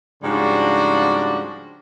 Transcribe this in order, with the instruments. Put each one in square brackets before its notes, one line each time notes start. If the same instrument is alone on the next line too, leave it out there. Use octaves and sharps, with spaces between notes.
[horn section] G#2 C#3 F3 G3 D4 F#4